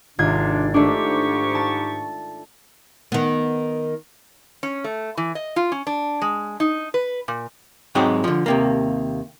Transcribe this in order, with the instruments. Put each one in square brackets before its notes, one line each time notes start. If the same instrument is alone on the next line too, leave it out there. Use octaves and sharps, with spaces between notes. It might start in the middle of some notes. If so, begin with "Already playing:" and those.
[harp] G#1 F4 G#6 [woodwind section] C3 D4
[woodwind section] G#2 G4 C#6 [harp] A3 D4
[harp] A5
[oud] D#3 B3
[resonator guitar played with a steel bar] C#4
A3
E3
D#5
F4
C#4
D4
G#3
D#4
B4
A#2
[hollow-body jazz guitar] G#2 F#3 G#3 C4 D#4 G4
D3 F3
D#2 C3 A#3